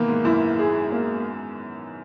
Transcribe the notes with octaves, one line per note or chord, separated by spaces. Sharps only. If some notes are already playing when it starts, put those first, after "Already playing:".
Already playing: B2 D#3 E3 A#3
G#2
F#2 E4
G#4
A#3